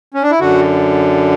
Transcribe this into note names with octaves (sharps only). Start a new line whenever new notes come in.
C#4
D4
E4
F#2 D3 F#4